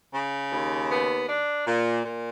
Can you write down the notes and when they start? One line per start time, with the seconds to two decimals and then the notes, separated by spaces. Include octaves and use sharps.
0.13 C#3
0.51 D#2
0.90 B3
1.28 D4
1.66 A#2
2.04 A#2